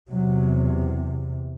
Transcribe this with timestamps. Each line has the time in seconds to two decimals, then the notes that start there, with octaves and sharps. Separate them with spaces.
0.11 E2 C3 F#3